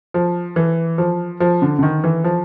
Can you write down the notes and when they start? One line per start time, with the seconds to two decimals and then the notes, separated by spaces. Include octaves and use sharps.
0.14 F3
0.56 E3
0.98 F3
1.40 F3
1.62 D3
1.79 D3
1.83 D#3
2.04 E3
2.24 F3